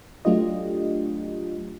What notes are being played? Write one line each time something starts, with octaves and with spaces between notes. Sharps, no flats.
F#3 A3 D4 F4 G4 D#5